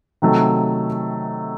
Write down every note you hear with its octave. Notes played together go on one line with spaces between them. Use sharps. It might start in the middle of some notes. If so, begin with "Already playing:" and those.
C3 D#3 F#3 A3